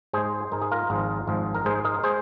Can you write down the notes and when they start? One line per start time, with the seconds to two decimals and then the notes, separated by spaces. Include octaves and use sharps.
0.13 G#2 G#3 G#4 C5
0.52 G#2 G#3 A#4
0.62 G#4
0.71 F4 A#4
0.90 G#1 G#2 F3 G#3
1.27 G#1 G#2 F3 G#3
1.55 A#4
1.65 G#2 G#3 G#4 C5
1.85 A#4 D#5
2.04 G#3 G#4 C5